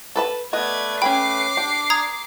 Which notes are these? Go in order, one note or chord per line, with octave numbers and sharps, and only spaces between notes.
A4 B4 A5
A3 B3 B4 D5 D#5 G#6
C#4 G5 G#5 B5 D6 C7
D4 G4
A#5 D#6 G#6